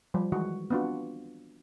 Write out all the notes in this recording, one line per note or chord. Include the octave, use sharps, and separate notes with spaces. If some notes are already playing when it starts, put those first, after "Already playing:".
F3 G3 G4
D#3 E3 G#3 F#4
B3 C4 D4 F4 F#4